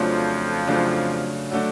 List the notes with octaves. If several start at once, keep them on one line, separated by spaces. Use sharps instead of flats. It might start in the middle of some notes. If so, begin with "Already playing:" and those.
Already playing: F2 C#3 F3 F#3 A3 D4 F4
C#3 F#3 A3 D4 F4
D3 F#3 A3 D4